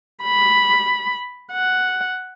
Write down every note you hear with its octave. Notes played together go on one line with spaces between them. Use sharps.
B5
F#5